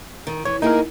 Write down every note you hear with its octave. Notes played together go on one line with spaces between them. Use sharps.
D#3
E3 C#5
A#3 D#4 E4 G#4 A#4